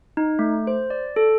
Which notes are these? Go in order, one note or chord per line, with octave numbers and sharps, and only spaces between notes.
D#4
A3
C5
D5
A4